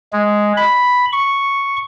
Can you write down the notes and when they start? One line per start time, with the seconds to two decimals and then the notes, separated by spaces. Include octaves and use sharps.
0.13 G#3
0.57 B5
1.13 C#6